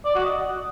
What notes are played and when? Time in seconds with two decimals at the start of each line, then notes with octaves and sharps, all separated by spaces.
0.05 D5
0.15 F#4
0.25 D#5